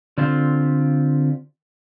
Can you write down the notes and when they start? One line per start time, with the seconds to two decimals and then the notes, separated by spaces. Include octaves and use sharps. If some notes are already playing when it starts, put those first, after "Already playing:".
0.18 D3 C4 F4 G4